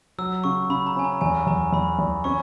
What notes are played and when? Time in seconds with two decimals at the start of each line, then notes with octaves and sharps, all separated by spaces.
0.18 F#3 E6
0.44 C#3 C#6
0.70 C#3 B5
0.87 A#5
0.96 C#4 G#5
1.04 A#5
1.21 E2 G#5
1.47 E2 A#5
1.73 E2 B5
1.99 E2
2.24 C#4 C#6